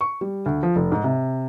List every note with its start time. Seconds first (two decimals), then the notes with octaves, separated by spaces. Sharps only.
0.01 C#6
0.21 G3
0.46 D2
0.63 F3
0.76 F1
0.92 G#2
1.04 C3